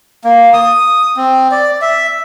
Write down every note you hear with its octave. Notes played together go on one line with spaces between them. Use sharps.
A#3
D#6
C4
D5
E5